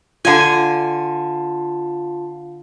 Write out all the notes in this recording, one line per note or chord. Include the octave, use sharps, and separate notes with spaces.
D3 F4 F5 G#5 A5